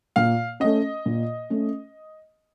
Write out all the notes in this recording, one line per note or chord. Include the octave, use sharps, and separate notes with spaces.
A#2 F5
A3 C#4 D#5
A#2
A3 C#4